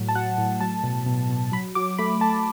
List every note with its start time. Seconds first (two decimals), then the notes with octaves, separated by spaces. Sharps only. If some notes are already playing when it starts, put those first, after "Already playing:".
Already playing: A2 F#3
0.09 A5
0.15 F#3 F#5
0.38 A2
0.61 F#3 A5
0.84 B2
1.06 B2
1.30 B2
1.52 F#3 B5
1.75 F#3 D6
1.98 A3 B5
2.21 A3 A5